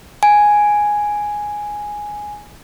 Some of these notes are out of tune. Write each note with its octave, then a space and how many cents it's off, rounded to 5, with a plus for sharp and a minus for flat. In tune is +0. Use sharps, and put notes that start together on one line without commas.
G#5 +0